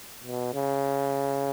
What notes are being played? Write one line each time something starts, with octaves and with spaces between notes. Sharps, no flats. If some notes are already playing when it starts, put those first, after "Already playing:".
B2
C#3